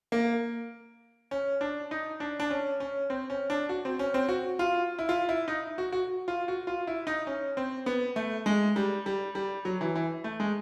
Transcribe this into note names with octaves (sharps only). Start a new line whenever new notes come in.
A#3
C#4
D4
D#4
D4
D4
C#4
C#4
C4
C#4
D4
F#4
C4
C#4
C4
F#4
F4
E4
F4
E4
D#4
F#4
F#4
F4
F#4
F4
E4
D#4
C#4
C4
B3
A3
G#3
G3
G3
G3
F#3
E3
E3
A3
G#3